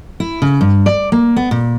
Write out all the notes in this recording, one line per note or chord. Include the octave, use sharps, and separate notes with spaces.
E4
C#3
G2
D5
A#3
B3
A#2